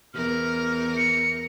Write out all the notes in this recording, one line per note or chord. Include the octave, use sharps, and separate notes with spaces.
E2 A#4 F6
C#7